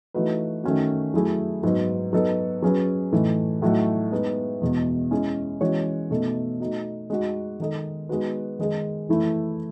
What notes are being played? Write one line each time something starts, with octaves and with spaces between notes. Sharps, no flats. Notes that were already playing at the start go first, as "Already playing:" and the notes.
E3 A3 D#4 F#4 B4
D#3 A3 C#4 F#4
F#3 A3 E4 G#4
G#2 F#3 B3
F#3 B3 D#4 F#4 A4
F#3 C#4 G#4 B4
A2 E3 A3 D#4
A2 F#3 A3 D#4 F#4
G#3 B3 D#4
E2 B2 G#3
G#3 C#4 E4 G#4
E3 G#3 C#4 F#4 C#5
B2 A3 D#4 A4
A3 D#4 F#4
G#3 D#4 F#4
D#3 G#3 D#4 A4 D#5
G#3 B3 D#4 F#4 B4
D#3 G#3 D#4 G#4
E3 A3 E4